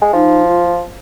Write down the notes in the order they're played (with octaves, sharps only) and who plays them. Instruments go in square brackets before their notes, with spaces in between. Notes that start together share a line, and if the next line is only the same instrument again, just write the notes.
[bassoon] G#3
[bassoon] F3 [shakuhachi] D#4
[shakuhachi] F4